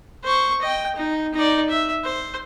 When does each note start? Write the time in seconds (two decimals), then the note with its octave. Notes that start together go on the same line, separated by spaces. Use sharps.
0.24 C5 C#6
0.62 D#5 G5
0.96 D#4
1.34 D#4 D5
1.69 E5
2.04 C5